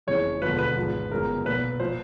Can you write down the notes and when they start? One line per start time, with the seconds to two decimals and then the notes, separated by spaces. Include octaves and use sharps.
0.07 F#1 F2 C#3 E3 C#5
0.42 E1 D#2 D3 F3 B4
0.59 B4
0.76 G#1 G#2 F3
1.11 G1 F#2 C#3 A#4
1.45 B1 A#2 F3 B4
1.80 A#2 F3 C5